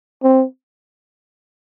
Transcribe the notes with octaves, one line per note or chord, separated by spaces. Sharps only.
C4